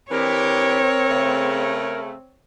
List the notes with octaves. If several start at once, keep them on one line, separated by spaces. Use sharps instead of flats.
E3 C4 D4 G4 A#4 C#5
C#3 A3